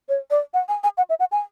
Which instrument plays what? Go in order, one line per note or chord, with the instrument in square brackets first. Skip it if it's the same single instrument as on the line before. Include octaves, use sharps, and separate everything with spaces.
[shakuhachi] C#5
D5
F#5
G#5
G#5
F#5
E5
F#5
G#5